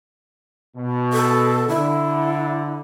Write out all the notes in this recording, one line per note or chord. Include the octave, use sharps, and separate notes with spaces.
B2
A4
D3 E4